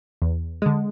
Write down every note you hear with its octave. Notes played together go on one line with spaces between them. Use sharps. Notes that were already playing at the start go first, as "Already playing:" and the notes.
E2
D3 G#3